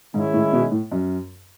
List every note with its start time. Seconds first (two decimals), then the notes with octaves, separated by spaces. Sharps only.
0.14 G#2 D#3 G#3 C#4 E4
0.34 A2
0.53 B2
0.71 A2
0.92 F#2